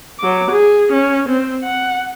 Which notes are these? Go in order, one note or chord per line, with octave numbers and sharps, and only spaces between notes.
F#3 D6
G#4
C#4
C4
F#5